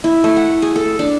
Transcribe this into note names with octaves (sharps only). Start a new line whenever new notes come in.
E4
A3
F#5
G#4
A4
D4